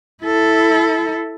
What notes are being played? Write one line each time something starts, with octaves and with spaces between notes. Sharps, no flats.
E4 A4